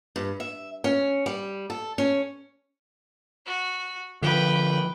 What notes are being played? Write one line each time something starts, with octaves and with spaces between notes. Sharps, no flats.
G2
E5
C#4
G3
A4
C#4
F#4
D3 F3 B4 G5